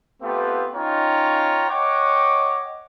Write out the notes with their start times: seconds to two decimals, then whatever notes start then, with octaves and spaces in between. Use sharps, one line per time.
0.22 A3 B3 C4 F4 G4 B4
0.74 C#4 D#4 F4 C#5 G5 A#5
1.70 C#5 D#5 F#5 G5 D6